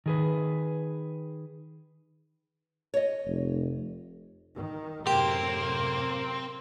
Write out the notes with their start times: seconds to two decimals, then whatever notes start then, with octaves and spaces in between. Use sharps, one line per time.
0.06 D#3 G#4 B4
2.94 C#5 D#5
3.26 F1
4.57 D#3
5.07 F#2 A2 C3 A#3 C4 G4